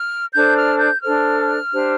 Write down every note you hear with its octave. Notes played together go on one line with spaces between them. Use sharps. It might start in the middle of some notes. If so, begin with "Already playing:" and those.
Already playing: F6
D4 A4 C5 G6
F6
G6
D4 A4 C5 F6
D4 G4 C5